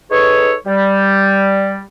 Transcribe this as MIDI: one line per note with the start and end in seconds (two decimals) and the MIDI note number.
0.11 0.53 63
0.11 0.53 68
0.11 0.53 69
0.11 0.53 71
0.11 0.53 73
0.67 1.81 55